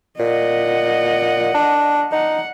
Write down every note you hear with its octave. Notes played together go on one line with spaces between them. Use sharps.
A#2 D#5 F#5
D4
D#4 F#5